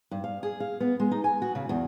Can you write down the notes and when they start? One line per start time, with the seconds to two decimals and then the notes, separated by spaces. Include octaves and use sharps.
0.11 G2
0.24 F5
0.43 G#4
0.60 F5
0.80 B3
1.00 G#3
1.11 D#4
1.24 G#5
1.42 F#4
1.55 C#3
1.69 E2